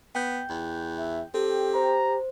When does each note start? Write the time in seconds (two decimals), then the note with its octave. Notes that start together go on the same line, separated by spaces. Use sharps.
0.15 B3 G5 G6
0.50 E2
0.97 E5
1.34 C4 G4 A4
1.75 C5 A#5